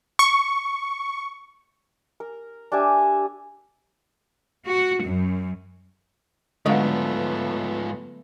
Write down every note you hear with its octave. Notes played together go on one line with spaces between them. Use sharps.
C#6
A#4
D4 G4 E5 G#5
F#4
F#2
G#2 D3 F3 F#3 G#3 A3 B3 F5